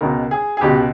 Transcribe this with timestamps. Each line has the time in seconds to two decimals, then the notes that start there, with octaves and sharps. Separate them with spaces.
0.01 C#2 B2 G#3 A#4
0.31 G#4
0.57 G#4
0.61 C#2 B2 G#3 G4